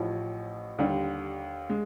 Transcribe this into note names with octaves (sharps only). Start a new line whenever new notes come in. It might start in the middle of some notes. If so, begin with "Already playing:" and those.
Already playing: A1 A2 F3
D#2 D3 G3
G#3